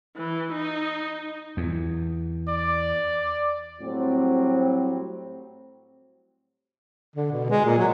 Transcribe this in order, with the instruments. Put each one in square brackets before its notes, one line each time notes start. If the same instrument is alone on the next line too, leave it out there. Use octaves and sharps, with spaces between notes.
[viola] E3
D#4
[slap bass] E2
[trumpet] D5
[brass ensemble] A2 F#3 G3 C4
[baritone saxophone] D3
B2
G#3
A#2
F#3